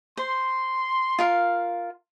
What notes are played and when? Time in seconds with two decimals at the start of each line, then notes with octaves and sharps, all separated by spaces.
0.17 C5 C6
1.19 F4 A#4 F5